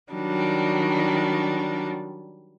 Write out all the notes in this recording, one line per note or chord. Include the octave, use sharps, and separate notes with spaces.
D#3 F#3 G3 D4